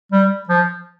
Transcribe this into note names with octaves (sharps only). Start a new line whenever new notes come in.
G3
F3